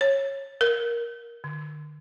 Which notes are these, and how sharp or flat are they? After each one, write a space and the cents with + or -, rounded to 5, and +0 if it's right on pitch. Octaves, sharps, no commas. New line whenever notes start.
C#5 -20
A#4 +15
D3 +40